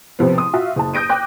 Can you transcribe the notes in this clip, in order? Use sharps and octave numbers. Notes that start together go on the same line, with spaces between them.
C3 F3 B3
C6 D#6
F4 F#4 E5 F5
F#1 A5
D#6 G6 A#6 D7 D#7
G5 D6 F#6 A#6